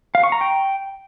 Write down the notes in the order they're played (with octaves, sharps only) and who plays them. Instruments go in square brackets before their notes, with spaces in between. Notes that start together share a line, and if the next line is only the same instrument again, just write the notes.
[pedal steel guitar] F5
C#6
A#5
G5